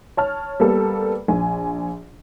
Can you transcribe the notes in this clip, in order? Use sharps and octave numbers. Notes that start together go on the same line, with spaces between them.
C#5 A5 F6
G3 A#3 B3 A4
A#1 G#5